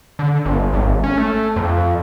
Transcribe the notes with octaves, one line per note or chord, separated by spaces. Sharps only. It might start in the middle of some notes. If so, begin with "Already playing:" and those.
D3
G1
G#1
C#4
A3
F2